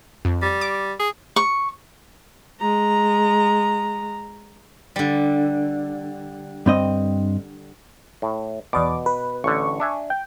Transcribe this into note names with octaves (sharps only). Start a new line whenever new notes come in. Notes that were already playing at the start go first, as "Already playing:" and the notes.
F2
G3
D6
G#4
C#6
G#3 A#5
D3 G3
G2 C4 D#5
A2
E2 B2 D5 D6
B4
A1 D3 C#6
D4 E5 G#5
G5